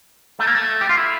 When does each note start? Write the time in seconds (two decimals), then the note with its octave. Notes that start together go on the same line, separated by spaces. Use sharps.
0.39 A3
0.47 A#3
0.55 A3
0.81 G4
0.89 F4
0.97 E4